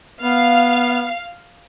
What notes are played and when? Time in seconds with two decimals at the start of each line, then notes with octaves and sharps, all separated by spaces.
0.23 B3 F5